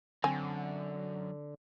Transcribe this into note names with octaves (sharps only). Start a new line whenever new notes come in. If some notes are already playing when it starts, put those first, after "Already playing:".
F#2 D3 C4 G#5